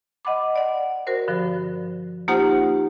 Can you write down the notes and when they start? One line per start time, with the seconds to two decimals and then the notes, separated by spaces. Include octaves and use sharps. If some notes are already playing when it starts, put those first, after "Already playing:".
0.25 D#5 F#5 B5 D6
0.56 D5 F#5
1.07 F#4 A#4 C5
1.28 G2 D3 F3
2.28 A#3 D#4 F4 G4 C5 F#5